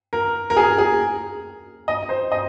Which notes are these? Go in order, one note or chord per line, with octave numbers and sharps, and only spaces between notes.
A#4
A#4
G#4
G#4
D#5
C5
D#5